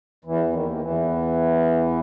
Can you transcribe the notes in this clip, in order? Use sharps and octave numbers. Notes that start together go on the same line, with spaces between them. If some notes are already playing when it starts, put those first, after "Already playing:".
E2 E3
D#2 D#3
D#3
E2 E3